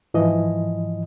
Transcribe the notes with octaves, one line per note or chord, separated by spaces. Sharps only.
G#2 E3 F3 D#5